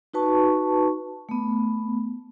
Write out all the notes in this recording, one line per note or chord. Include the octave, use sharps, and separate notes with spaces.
D#4 F#4 B4 A5 C#6
A3 B3